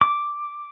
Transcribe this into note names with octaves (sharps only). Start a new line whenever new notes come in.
D6